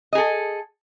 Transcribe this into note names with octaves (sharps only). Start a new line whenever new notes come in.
G#4 A4 D#5